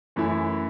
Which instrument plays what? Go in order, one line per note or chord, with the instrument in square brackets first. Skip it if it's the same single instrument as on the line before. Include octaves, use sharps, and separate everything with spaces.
[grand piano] F#2 E3 A3 C#4 E4